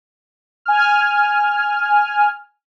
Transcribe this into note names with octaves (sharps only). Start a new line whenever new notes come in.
G#5 F6